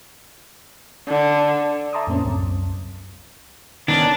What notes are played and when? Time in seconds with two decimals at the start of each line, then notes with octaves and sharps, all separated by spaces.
1.08 D3
1.93 E5 A5 A#5 C6 D6 D#6
2.07 F2 A2 A3 A#3 C4 C#4
2.24 C2 F#2
3.88 D#3 B3 C#4 D4